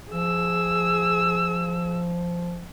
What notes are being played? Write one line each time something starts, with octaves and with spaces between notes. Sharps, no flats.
F3 G#4 E6